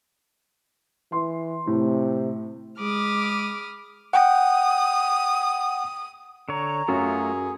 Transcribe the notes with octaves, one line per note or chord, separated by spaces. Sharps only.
E3 C6
A2 C3
G#3 B5 D6 D#6 F6
F#5 G5 D#6
D3 C#5 A#5 C#6
F#2 A3 F4 F#4 G#4